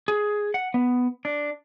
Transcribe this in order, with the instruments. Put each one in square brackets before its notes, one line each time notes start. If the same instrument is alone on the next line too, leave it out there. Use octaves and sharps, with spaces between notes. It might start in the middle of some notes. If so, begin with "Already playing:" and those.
[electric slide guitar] G#4
F#5
B3
D4